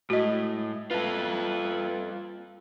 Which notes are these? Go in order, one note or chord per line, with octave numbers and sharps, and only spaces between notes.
A2 G#3 F#4 D#5 D#6
G3 A#3 F4 A4 B4 E5